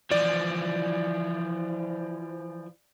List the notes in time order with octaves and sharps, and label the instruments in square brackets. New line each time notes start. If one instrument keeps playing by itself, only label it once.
[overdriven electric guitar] E3 F3 [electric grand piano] D5